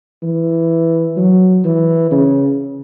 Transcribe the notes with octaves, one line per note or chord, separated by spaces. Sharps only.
E3
F#3
E3
C#3